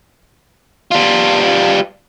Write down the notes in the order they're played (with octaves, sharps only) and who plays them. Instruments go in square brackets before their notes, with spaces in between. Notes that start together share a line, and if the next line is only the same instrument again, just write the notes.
[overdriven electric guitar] G3 F4